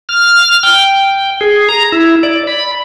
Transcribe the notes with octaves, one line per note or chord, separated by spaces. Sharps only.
F6
G5
G#4
A#5
E4
D5
B5